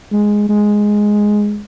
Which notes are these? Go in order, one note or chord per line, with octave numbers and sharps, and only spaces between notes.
G#3
G#3